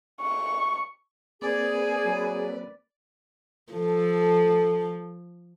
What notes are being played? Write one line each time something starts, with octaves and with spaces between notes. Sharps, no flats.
C#6
A#3 C4 G#4 B4 D5
F#3
F3 A4